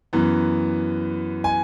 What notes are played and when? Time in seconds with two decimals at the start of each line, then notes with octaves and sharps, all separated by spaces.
0.13 F#2 E3 B3
1.44 G#5